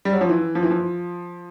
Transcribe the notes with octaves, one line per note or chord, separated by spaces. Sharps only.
G3
F#3
F3
E3
F3
E3
F3